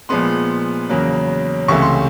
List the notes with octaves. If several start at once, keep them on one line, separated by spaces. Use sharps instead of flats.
A#2 F3 G#3 B3 C6
E2 C#3 F#3 A#3
C#2 C3 E3 A3 C#6
C6